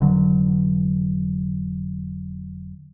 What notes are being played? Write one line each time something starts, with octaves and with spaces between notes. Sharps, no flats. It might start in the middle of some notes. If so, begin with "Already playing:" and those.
F1 D3 F#3